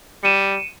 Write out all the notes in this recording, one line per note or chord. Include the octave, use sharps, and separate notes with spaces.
G3 C#7 D#7 E7